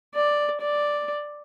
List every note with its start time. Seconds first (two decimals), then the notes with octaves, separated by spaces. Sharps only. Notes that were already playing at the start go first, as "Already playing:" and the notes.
0.14 D5
0.61 D5